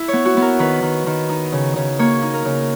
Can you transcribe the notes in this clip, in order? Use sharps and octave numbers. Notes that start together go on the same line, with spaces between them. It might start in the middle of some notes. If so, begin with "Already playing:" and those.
Already playing: E4
B3 C#5
F#4
B3
A#4
D#3 B4
D#3
D#3
D#4
C#3
C#3
A#3 C#5
D#4
A#4
C#3